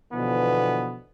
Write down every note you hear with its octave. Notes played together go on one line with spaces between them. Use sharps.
B2 D3 E3 F3 B3